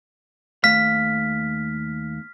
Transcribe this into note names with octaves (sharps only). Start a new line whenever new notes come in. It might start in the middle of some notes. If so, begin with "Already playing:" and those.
D#2 A3 F5 F6 B6